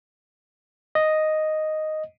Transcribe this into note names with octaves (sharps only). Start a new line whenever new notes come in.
D#5